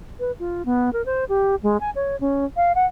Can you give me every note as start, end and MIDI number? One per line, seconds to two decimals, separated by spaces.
0.20 0.32 71
0.39 0.65 65
0.65 0.90 59
0.93 1.04 70
1.06 1.25 72
1.29 1.55 67
1.63 1.77 56
1.80 1.90 80
1.95 2.16 73
2.20 2.45 61
2.56 2.72 77
2.75 2.86 78